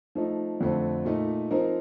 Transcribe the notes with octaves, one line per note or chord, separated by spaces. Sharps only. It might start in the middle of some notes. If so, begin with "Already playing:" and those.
F3 A3 D#4
F2 D3 A3 C4
A#2 A3 D#4
F3 C4 D#4 A#4